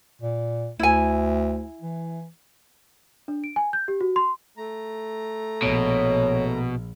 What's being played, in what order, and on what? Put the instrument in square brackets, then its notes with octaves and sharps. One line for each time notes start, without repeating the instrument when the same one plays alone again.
[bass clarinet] A#2
[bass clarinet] D2 [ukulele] E4 G#5
[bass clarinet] E3
[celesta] D4
D7
G#5
G6
G4
F#4
C6
[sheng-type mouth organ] A3 A#5
[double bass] A#1 [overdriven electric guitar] B2 [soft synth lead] C#5